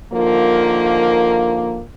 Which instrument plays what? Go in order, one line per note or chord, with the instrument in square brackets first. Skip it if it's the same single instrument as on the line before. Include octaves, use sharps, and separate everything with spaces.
[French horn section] D3 D#3 F3 A#3